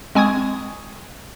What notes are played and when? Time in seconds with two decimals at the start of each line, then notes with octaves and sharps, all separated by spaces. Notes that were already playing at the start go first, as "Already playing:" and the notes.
0.15 G#3 C4 G#5 C#6 D#6 G#6